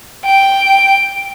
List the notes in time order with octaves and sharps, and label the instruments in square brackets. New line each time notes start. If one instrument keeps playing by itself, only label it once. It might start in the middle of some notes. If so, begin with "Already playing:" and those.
[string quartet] G5